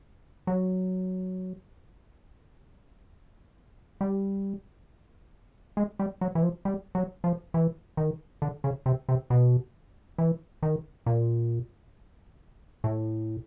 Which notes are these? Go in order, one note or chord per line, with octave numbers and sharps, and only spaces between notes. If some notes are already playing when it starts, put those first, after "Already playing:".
F#3
G3
G#3
G3
F#3
E3
F3
G3
F#3
F3
E3
D#3
D3
C#3
C3
C3
B2
E3
D#3
A#2
A2